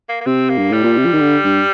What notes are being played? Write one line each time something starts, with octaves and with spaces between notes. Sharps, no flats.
A#3
A#3
C3 C4
A#3
G2
A2 G3
A#2
C3
F3
D#3
D3
G2